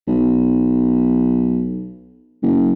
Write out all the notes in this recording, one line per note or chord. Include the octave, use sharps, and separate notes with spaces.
B1
F#1